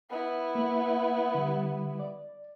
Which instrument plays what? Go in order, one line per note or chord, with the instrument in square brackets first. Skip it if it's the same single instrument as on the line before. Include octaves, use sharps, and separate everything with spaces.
[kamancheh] B3 E4
[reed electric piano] A#3
D3 G3
D5